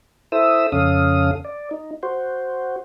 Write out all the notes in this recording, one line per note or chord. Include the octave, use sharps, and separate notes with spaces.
E4 A4 C5 E5 D#6 E6
F2 C#3 C#4 A4 F5 D#6
D5
D#4
F#4 C5